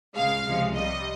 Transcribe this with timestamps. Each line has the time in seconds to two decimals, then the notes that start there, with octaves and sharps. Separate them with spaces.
0.15 C#2 C#3 G#3 F5
0.45 C#2 C3 F3 G#3
0.73 C2 C3 G3 D#5